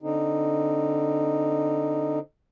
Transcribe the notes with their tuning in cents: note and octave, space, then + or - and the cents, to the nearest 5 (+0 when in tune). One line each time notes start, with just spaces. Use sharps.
D3 +0 C4 +0 D#4 -10